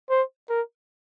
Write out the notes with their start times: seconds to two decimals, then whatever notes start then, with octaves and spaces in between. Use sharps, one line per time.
0.10 C5
0.49 A#4